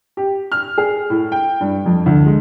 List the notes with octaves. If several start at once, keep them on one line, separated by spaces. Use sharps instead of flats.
G4
F6
G#4
A2
G5
G2
F2
D2
G#3